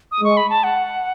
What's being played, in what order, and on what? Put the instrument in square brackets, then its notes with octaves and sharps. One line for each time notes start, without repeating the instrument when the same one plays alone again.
[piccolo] D#6
[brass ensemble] G#3 [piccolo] C#6
[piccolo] B5
A5
F#5